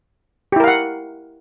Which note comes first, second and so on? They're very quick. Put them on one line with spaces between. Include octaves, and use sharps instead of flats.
G4 E4 A#4 F5 F#5